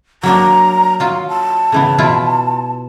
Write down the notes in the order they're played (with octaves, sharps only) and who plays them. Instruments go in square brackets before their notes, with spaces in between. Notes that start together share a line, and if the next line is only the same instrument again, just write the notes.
[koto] F#3 A#3 D4 [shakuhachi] A#5
[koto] F#3 F4 [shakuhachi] F5
[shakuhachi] A5
[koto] C#3 E3 B3
B2 E4 F4